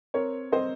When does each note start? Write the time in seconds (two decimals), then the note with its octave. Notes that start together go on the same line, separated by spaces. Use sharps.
0.14 C4 A#4 C#5
0.52 C4 C5 D#5